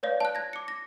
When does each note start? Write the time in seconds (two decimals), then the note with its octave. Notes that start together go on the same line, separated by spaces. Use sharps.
0.03 B4 C#5 D5 F5
0.20 A5 F#6
0.35 G#6 A#6
0.53 D6 C#7
0.68 A#6